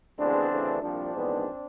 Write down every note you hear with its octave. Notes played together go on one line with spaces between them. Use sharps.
D2 C#3 E3 G#3 B3 C4 D4
D2 C#3 E3 A3
C2 A#2 F3 C4 D4
A#1 G#2 E3 G#3 B3